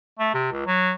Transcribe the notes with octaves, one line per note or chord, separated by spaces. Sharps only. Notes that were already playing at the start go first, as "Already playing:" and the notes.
A3
C3
C#2
F#3